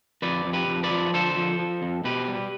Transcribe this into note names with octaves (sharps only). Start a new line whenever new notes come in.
F2 B4 D5
F2
G4 B4
F2
B4 D5
F3
D3 A4 C5
F3
F3
F2
B2 G4 B4
G3